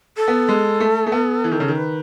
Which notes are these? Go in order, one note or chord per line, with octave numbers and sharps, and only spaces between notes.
A4
B3
G#3
A3
A3
B3
E3
D#3
C#3
D#3
B4